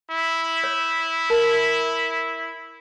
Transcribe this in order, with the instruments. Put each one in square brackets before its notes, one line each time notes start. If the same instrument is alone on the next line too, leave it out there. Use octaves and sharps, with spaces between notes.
[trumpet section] E4
[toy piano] C#5
A#4 A5